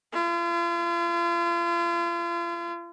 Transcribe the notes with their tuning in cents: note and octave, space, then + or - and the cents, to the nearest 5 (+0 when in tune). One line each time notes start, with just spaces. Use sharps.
F4 -40